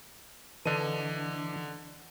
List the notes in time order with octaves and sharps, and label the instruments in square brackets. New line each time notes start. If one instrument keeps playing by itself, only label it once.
[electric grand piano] D3 D#5 D#7 [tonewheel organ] E3 D4